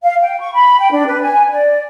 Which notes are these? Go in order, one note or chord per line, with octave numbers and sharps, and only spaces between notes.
F5
G5
C#6
B5
G5
D4
B4
G#5
D5